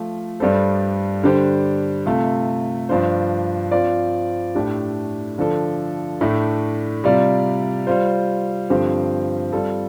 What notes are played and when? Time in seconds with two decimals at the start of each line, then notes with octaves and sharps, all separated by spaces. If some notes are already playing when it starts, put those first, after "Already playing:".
Already playing: F3 A3 F4
0.40 G2 G3 D4 A4 C5
1.23 D3 G3 D4 G4 C5
2.06 C3 A3 F4
2.89 G2 F3 D4 F4 C5
3.71 F3 C4 F4 D5
4.55 A2 A3 D4 G4
5.38 D3 F3 D4 A4
6.21 A2 A3 D4
7.04 C3 G3 F4 D5
7.87 G3 F4 C5
8.70 G2 D3 F3 C4 G4
9.53 G3 C4 F4 A4